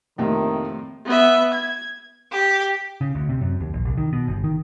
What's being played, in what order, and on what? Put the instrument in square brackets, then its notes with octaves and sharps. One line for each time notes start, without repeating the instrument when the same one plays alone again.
[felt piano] F2 A3 A#3 [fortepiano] A2 C3 [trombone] D#3
[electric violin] B3 E5
G#6
[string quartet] G4
[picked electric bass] C#3
D2
C3
F#2
D#2
A#1
C2
D#3
B2
G1
D#3